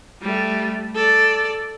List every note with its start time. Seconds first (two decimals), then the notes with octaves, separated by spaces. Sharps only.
0.22 G3 A3
0.95 A4 D5